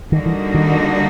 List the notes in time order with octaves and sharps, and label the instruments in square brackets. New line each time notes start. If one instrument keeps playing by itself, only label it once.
[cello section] D3 G3 A#3 D#4 F#4 [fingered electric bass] D#3
[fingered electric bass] E3
D#3